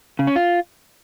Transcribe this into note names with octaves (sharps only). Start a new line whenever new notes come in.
C#3
C#4
F4